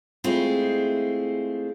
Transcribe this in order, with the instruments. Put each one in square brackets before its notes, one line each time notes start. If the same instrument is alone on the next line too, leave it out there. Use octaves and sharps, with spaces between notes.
[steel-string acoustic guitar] G#3 A3 C4 E4 F4 G#4